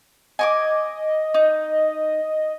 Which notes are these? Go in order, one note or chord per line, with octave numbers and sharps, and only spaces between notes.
D#5 G#5 C#6 D6
D#4